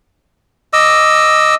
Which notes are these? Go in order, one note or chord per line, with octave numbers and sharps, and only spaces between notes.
D#5 D6 E6